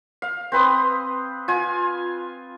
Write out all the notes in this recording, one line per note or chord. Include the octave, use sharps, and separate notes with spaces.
F5
C4 B4 C6 D#6
F4 G#5